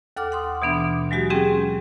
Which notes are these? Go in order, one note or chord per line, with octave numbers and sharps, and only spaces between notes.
D#2 A4 F#5 D6 F6
F#5 C6 D#6
B2 E3 B3 D4
F#3 G#3 F#4 G4
G#3 C4 C#4 G4 G#4 G5